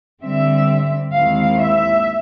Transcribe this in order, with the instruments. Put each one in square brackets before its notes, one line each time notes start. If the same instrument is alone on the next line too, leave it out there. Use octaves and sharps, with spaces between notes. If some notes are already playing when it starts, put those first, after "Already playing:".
[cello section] D3 G3 C4 E5
D#2 D#3 G#3 C4 E4 F5
E5